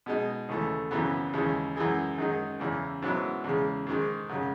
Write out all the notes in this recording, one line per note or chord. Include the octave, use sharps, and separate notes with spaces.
B2 G#3 D#4
D#2 C#3 E3 A3
G#1 F#2 C#3 E3 B3
D#2 C#3 E3 G#3
F#2 E3 G#3
F#2 D#3 G#3 D#4
E2 C#3 E3
G#2 F#3 B3 E4
E2 C#3 G#3
G#2 D#3 G#3
F#2 C#3 G#3